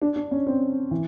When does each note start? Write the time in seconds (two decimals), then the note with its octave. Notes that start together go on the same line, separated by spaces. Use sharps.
0.02 D4
0.16 D4
0.31 C#4
0.47 C4
0.91 E3